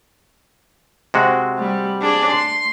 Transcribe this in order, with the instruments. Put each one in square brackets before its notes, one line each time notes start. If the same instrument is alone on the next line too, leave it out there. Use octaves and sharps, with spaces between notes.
[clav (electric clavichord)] C3 G#3 F#4
[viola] G3
D4 G#4
C6